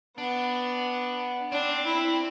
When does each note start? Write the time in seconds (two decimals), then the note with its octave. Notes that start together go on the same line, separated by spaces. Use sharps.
0.17 B3 D4
1.52 C4 D4
1.85 E4